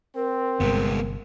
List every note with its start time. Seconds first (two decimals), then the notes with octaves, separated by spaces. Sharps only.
0.16 C4 A#4
0.60 G1 G2 C3 G#3 B3